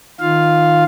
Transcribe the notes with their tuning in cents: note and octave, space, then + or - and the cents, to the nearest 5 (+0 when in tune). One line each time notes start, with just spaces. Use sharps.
D#3 -5 F4 +0 F5 +0